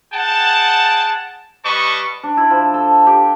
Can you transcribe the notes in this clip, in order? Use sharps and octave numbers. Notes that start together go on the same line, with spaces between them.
G#4 F#5 G5 A5
G3 B4 D#5 A5 C#6
D4
E4
F3
A4
G4